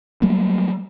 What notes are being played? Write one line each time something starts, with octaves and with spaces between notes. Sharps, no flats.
F#3 G3 A3 A#3